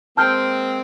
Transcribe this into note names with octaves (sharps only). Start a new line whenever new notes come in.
G#3 A#3 C4 A5 F6 G6